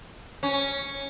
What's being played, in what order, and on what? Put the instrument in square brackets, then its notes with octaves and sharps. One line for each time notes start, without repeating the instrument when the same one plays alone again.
[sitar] C#4